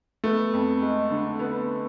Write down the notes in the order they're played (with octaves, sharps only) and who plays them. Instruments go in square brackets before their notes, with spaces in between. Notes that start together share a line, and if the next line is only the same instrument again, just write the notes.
[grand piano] A3 [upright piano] B3
[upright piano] F2
G#3
D3
B3